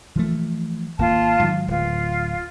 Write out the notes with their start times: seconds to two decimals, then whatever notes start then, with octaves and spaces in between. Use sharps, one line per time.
0.16 E3 F3 A3
0.99 G#1 A#3 F4 A5
1.39 G#2 D#3 F#3
1.68 D1 F4